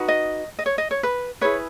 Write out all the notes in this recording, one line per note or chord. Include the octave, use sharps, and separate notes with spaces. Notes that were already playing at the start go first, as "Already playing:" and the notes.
Already playing: D#4 F#4 B4
D#5
D#5
C#5
D#5
C#5
B4
E4 G#4 B4 C#5